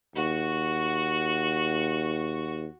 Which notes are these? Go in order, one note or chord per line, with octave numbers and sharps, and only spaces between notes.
D#2 F#4 C#6